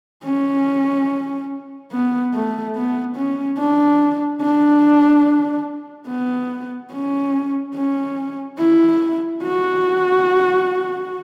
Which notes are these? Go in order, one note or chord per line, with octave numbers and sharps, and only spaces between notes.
C#4
B3
A3
B3
C#4
D4
D4
B3
C#4
C#4
E4
F#4